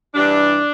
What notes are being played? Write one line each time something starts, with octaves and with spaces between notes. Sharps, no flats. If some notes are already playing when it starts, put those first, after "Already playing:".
G2 E3 G3 D4